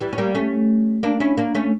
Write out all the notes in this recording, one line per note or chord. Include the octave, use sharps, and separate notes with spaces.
E3 G3
C#4
G3 A#3
A3 C#4
A#3 D4
C#4 E4
A#3 D4
A3 C#4